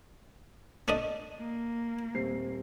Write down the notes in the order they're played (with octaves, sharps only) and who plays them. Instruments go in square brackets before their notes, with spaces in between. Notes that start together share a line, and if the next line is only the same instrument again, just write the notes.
[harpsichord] A3 D4 D#5 [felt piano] D#7
[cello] A#3
[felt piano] D#1 C4 C7